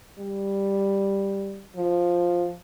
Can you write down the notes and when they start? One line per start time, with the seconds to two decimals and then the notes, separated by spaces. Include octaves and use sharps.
0.18 G3
1.76 F3